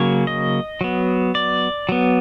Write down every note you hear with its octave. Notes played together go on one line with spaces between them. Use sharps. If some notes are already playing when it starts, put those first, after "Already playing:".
Already playing: C#3 F#3 A#3 C#4 C#5
D#5
F#3 B3
D5
F#3 B3